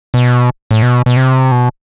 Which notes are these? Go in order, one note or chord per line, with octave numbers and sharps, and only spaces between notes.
B2
A2
B2
B2
C3
B2